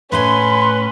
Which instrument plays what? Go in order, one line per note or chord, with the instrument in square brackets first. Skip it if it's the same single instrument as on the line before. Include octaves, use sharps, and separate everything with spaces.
[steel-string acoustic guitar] A2 D#4 G#5 [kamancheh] C#4 [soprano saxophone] B4 [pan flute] C6